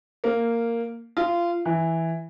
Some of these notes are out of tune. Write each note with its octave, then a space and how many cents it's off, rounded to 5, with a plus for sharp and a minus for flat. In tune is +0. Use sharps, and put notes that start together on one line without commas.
A#3 -10
F4 -20
E3 -5